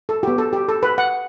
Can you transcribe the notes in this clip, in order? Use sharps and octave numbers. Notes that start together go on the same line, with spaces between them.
A4
B3 F#4 G4
A4
G4
A4
B4
F#5